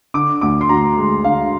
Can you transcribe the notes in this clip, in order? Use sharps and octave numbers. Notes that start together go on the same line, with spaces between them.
D3 D6
D2 D6
C6
D2 A#5
G#3
D3 F5